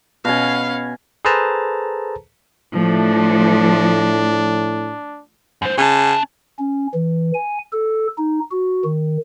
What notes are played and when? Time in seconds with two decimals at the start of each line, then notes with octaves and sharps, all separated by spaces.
0.25 B2 C#4 F5 G#5
1.25 G#4 A4 B4 C5 A5 A#5
2.75 A2 F3 A3 D4
5.62 F#2 C5
5.78 C#3 C#4 A5
6.59 C#4
6.94 E3
7.34 G#5
7.73 A4
8.18 D#4
8.51 F#4
8.85 D#3